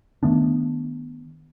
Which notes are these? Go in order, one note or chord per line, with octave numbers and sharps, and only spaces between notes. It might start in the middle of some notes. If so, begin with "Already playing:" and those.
D#3 A3 B3 D4